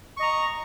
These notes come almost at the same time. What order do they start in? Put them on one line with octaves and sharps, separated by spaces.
C#6 D#5 A#5